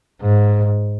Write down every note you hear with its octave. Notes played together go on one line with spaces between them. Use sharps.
G#2